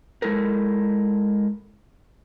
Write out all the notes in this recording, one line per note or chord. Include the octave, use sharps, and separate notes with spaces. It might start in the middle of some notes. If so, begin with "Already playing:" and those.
G#3 E4 A4 A#4